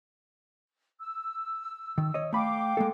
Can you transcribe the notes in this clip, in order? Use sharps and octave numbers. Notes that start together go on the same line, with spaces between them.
E6
D#3
C#5 D#5
A3 F5 G5 B5 D6
G#3 A#3 A4